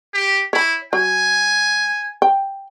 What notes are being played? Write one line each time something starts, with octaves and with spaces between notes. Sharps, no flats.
G4
E4 C#5 B5
F#3 G#5
G5